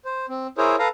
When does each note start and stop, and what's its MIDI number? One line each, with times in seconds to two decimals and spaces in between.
0.05 0.26 72
0.29 0.47 60
0.58 0.76 64
0.58 0.76 68
0.58 0.76 70
0.58 0.76 72
0.58 0.76 73
0.79 0.88 69
0.79 0.88 71
0.79 0.88 77
0.79 0.88 82